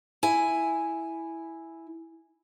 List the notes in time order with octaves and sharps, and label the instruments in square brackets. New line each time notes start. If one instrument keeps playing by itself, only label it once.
[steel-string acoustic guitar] E4 G#5